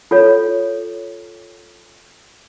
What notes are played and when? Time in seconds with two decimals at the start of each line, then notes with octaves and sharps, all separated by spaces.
0.11 F4 A4 C#5